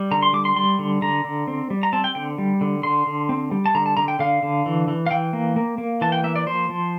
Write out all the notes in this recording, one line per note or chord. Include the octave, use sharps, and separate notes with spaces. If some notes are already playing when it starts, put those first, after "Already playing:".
Already playing: G3
D3 A#5
C6
G3 D6
C6
G3 C6
D3
D3 A#5
D3
C4
G3
A#5
C4 A5
G5
D3 G5
G3
D3
D3 C6
D3
C4
G3
A5
D3 A#5
A5
D3 A#5
G5
D3 F5
D3
E3
E3
F5
E3 G5
A#3
A#3
A#3
E3 A5
G5
A#3 E5
D5
F3 C5
F3